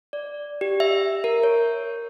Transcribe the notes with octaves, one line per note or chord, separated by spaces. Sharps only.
D5
G4
E5
A#4
C#5